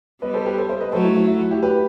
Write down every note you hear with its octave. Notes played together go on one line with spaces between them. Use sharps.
G3 B3 B4 D#5
A4 C5
G4 B4
A4 C5
C5 E5
B4 D#5
F#3 A3 A4 C5
E4
E4
E4
F#4
E4 G4
G4 B4